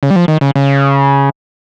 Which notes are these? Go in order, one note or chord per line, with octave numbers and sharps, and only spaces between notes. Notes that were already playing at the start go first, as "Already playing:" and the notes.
C#3
G3
F3
D#3
C#3
C#3